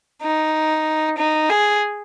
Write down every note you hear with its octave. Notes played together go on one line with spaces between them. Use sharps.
D#4
D#4
G#4